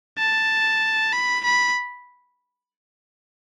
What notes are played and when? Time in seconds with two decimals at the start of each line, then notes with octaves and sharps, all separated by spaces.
0.18 A5
1.13 B5
1.44 B5